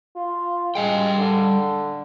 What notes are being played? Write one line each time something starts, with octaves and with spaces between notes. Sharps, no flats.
F4
G3 G#3 F5 G5
D3